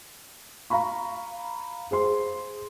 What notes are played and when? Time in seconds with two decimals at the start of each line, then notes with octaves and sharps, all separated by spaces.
0.70 F5 A#5 B5 C#6
1.91 G#4 C5 C6